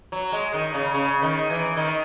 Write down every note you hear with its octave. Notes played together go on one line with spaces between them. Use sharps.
F#3
G#3
D#3
C#3
C#3
D#3
E3
D#3